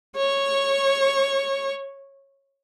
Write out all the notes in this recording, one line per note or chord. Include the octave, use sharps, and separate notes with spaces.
C#5 C#6